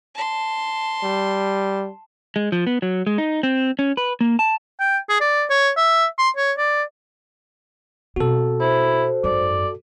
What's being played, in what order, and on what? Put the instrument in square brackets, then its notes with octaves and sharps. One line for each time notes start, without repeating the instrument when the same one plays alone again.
[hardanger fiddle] A5 C6
[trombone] G3
[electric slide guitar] G#3
F3
B3
F#3
G#3
D#4
C4
C#4
B4
A#3
A5
[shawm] G5
G#4
D5
C#5
E5
C6
C#5
D5
[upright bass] B2 C4 [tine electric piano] F#4 A4
[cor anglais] E4 [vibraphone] C5
[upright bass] G#1 F#2 [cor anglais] D5